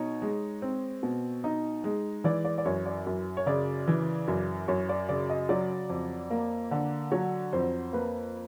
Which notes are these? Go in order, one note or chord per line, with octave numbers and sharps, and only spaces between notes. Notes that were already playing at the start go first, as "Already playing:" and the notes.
Already playing: B2 D#4 C#5
G#3
C4
B2
D#4
G#3
E3 D5
D5
D5
F#2 C#5
D5
F#2
C#5
C#3 D5
E3
F#2
F#2 C#5
D5
C#3 D5
D#5
F#3 D5
F2
A#3
D3
F#3 C#5
F2 C5
A#3 B4